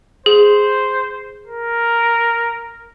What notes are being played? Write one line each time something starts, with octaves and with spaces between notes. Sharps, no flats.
G#4 C5
A#4